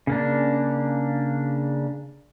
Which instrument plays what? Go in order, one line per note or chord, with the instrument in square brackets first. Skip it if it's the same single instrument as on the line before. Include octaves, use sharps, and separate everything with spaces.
[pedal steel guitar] C#3 A#3 D4